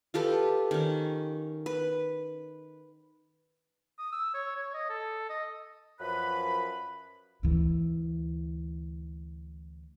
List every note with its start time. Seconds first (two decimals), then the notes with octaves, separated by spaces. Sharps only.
0.14 F4 G4 A4 B4
0.71 D#3 C#4
1.66 B4
3.99 D#6
4.12 E6
4.34 C#5
4.56 C#5
4.74 D#5
4.89 A4
5.29 D#5
6.00 F#2 F3 B4 B5
7.43 D2 E3